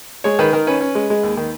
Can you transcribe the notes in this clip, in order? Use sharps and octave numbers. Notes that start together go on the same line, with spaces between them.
G#3 C#5
D#3 B4
D#3 A#4
C#4 B4
C#4
G#3
G#3
D#2
D#3